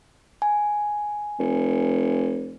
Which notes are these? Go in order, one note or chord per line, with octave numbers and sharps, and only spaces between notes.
G#5
F1